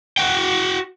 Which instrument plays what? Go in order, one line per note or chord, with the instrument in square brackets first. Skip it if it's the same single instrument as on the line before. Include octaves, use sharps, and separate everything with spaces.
[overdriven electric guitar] F#4 G5